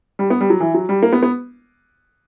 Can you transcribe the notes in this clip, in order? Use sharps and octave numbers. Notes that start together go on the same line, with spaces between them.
G3
B3
G3
F#3
E3
F#3
G3
A#3
B3
B3